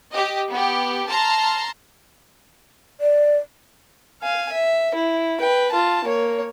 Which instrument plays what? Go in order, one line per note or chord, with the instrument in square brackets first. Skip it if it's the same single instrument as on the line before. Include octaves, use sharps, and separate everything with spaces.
[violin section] G4 D#5
B3 G4
A5 A#5 C6 F6
[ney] D5
[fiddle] F5 G#5
E5
E4
B4 G5
F4 A5
A#3 C#5